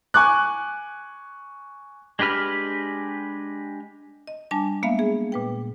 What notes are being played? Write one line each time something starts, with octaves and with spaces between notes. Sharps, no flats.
G#5 C#6 D6 F#6
G#3 D4 G4 B4 F6
D#5
G3 D4 G#5 A5
G#3 A#3 B3 E5 F5
G#4
A#2 B4 G5